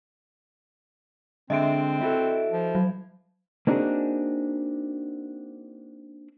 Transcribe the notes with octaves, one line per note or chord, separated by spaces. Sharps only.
D3 G#3 C4 D4 D#5 E5 D7
E4 F#4 A4
F3
F#3
A#3 C4 D4 D#4 F#4 G#4